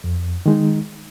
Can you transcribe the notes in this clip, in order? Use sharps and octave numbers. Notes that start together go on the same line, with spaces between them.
F2
D#3 G#3 D#4